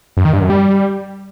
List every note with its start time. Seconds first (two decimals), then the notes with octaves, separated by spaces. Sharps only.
0.17 F#2
0.25 D#3
0.33 G2
0.42 F#2
0.50 G3